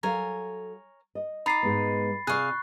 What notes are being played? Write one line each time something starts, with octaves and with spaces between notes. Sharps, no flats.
F#3 A4 A#4 C#5 F5 G#5
D#5
D#4 B5 D6 A6 C7
G#2 G#3 B3
C3 F4 G#4 D5 F5 C#6 F#6